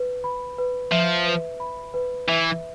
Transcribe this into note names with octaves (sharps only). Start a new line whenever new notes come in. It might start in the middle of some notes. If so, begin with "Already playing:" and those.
Already playing: B4
B5
B4
F3 E5
B4
B5
B4
E3 E5